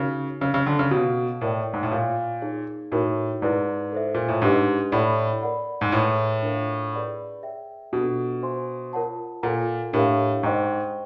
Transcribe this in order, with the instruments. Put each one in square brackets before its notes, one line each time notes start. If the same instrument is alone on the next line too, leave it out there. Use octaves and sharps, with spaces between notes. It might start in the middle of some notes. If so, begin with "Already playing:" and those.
Already playing: [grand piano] C#3 [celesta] D#4 F#4 A#4
[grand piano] C#3 [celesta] A#4 C#5 F5 G#5
[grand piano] C#3
D3
C#3
[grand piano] B2 [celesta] A4 C#5 F5
[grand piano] A2 [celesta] A#4 D5 G5
[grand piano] G#2
A2
[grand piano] A#2 [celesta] F4 A#4 C#5 F5
[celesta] D#4 G#4 C#5
[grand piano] A2 [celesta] D#4 F#4 A#4
[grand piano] G#2 [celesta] E4 G#4 B4 D5
[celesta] A4 C5 E5
[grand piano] A#2
A2
[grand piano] G#2 [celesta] D4 G4 B4 D#5
[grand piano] A2 [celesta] A4 D5 F#5 B5
[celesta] A#4 D5 F#5 B5
[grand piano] G#2
[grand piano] A2 [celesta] G#4 B4 E5
[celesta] D4 F4 A#4 C#5 F5
G#4 B4 D5 F#5 B5
G#4 C#5 E5 G5
[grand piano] B2 [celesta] D4 F4 A4
[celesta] C5 E5 G#5 C6
F4 A#4 C#5 F#5 A5
[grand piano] A#2 [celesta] A4 C#5 F#5 A#5
[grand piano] A2 [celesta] D4 G4 A#4 C#5 F5
[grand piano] G#2 [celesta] C5 D#5 G5 A#5 C#6